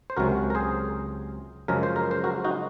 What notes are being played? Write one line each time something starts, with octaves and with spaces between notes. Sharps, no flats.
C5
C#2 C3 F#3 F#4 A#4
A#4
G#4 C5
F#2 C#3 F3 G#3 A#4
C5
A#4
C5
F#4 A#4
D#4 F#4